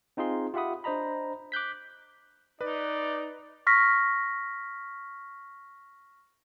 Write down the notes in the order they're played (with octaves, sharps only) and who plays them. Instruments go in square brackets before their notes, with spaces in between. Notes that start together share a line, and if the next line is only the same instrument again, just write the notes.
[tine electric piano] C4 D#4 F4 G#4 C6
F4 G4 E5 F#5 B5 D#6
D4 C5 D#5 A#5 B5
D6 F#6 G6 B6
[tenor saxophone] D#4 [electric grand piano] B4 [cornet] D5
[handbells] C#6 F6 A#6 B6